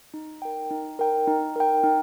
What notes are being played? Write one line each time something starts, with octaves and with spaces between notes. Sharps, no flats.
D#4
A#4 G5
D#4
A#4 G5
D#4
A#4 G5
D#4